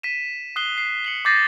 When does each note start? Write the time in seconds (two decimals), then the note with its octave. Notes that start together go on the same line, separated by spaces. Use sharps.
0.03 B6 D#7 E7
0.56 D#6 F#6 C7 G7
0.78 C7
1.05 C#7 F#7 G7
1.25 D6 G6 A6 A#6 C7 D#7